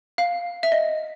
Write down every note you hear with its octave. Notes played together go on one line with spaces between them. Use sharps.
F5
E5
D#5